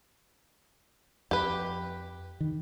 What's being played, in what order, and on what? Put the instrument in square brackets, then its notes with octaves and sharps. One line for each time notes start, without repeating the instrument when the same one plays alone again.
[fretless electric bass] F2 [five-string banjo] G4 B4
[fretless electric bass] D#3